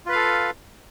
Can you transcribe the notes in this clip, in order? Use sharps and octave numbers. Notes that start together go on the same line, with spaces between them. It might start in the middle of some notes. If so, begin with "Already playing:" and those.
F4 A4 B4 F5